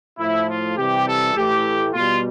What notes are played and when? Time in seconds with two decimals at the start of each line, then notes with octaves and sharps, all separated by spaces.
0.19 A2 F3 A3 E4
0.48 F4
0.77 C3 E3 G3 G4
1.07 A4
1.36 A2 E3 A3 G4
1.94 B2 G3 F4